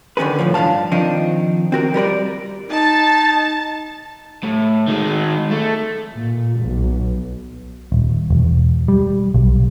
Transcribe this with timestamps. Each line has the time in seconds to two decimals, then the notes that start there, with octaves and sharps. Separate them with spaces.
0.17 D3 D#3 C#4 G#4 B4
0.39 C2 A2 D#3 F3
0.54 G2 D4 F4 F5 A5
0.91 D#3 F3 C4 D4 D#4
1.72 C4 F#4 A#4
1.94 G3 A#4 B4 D5
2.70 D#4 A5
4.43 A2
4.88 D#3 G#3
5.51 A3
6.13 A#2
6.62 B1
7.92 D#1
8.30 E1
8.88 G3
9.34 B1